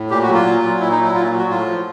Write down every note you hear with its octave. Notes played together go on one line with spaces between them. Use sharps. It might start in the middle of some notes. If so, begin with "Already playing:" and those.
Already playing: A2
A#2 G4
F#4
F#3
F4
A#2
F#3
A#2 E4
D#4
F#3
E4
A#2 F4
F#3
F#4
A2 F4
F3